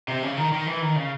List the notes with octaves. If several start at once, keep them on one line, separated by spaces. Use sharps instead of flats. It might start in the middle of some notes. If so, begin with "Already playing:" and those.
C3
C#3
D#3
D#3
E3
D#3
C#3